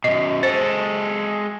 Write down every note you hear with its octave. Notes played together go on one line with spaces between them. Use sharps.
F#2 B2 D#5
G#3 A4 C5